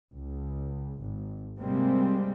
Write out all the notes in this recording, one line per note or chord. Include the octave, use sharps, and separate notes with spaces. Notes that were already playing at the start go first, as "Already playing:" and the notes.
C#2
G#1
C3 G3 G#3 A#3 C4